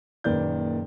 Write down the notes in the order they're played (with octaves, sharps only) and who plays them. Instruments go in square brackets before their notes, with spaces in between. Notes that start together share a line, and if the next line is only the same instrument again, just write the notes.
[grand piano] F#1 A#2 D#3 B4 D5 G6